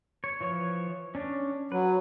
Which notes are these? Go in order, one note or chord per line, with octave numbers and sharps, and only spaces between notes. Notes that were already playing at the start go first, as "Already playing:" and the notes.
C#5
E3 F3 C#5
C#4 D4
F#3 B4